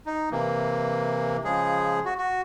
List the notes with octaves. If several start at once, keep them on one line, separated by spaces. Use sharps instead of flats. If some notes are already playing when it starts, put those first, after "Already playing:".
D#4
C3 E3 A#3
C#3 F3 G#3 G#4
F#4
F#4